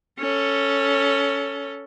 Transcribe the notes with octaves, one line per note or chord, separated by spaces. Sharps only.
C#4 A4